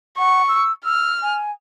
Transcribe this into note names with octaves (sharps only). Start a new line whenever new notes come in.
F#5 C#6
E6
E6 F6
G#5